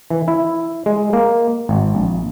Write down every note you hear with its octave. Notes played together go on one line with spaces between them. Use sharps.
E3
E4
G#3
A#3
G#1
A#1